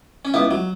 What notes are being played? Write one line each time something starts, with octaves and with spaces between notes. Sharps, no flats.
C#4
C#2 B3 E4
F#3